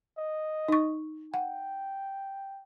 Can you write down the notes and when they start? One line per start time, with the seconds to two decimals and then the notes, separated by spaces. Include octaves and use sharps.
0.18 D#5
0.68 D#4 C#6
1.34 F#5 G5